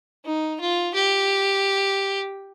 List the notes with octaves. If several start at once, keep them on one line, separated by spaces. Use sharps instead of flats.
D#4
F4
G4